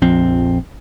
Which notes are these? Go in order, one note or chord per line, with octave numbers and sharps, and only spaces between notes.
A#1 F2 C4